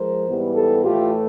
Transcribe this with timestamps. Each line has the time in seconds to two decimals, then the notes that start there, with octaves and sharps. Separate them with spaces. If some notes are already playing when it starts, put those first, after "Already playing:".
Already playing: F3 G#3 A#4 C5
0.26 G#2 E3 G3 B3
0.55 G4 A4
0.85 A2 E3 A3 F4 G4